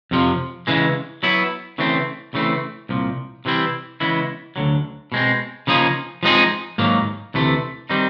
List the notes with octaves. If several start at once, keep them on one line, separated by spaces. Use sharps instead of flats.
F2 C3 F3
C#3 E3 G#3
F#3 B3 E4
C#3 E3 A3 C4
C#3 E3 A3 C4
C2 A#2 F3
C3 E3 G3 C4 E4
C#3 E3 G#3 B3 E4
D2 D3 F#3
B2 G#3 C4
C#3 F3 A#3 D#4 G#4
F3 G#3 C4 D#4 G#4
G#2 D#3 F#3 A#3
D2 C3 E3 A3
D#3 G3 C4 D#4